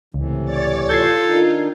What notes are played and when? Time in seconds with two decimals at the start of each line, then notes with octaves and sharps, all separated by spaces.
0.14 C#2 A2 C3 E3
0.45 C#5 D5 A6
0.89 F4 A4 G6 G#6 C7
1.24 D#3 D4 D#4